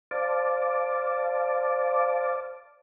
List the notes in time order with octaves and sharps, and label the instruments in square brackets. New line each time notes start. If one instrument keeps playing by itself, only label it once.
[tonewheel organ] C5 D5 F5 A5 D6